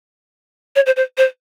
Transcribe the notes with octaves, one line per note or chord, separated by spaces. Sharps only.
C#5
C5
C5
C5